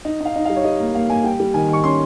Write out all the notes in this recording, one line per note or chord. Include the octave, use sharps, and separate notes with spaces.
D#4
D#4 F5
D#4
G3 F5
C#5
G3 D#5
A#3
A#3 F5
A#3 G#5
G3 G5
G3
D#3 G#5
D#3 C#6
C#4 C6